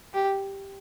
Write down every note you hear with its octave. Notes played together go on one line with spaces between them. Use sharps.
G4